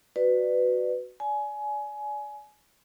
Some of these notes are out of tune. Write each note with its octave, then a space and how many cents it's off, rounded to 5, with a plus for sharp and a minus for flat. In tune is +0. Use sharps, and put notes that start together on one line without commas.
F#4 +0 B4 +15 D5 +20
D5 -15 G#5 +20